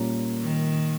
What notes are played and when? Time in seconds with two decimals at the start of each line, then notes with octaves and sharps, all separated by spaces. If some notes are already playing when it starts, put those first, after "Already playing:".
Already playing: A#2 G3 A#3 C#4
0.41 D#3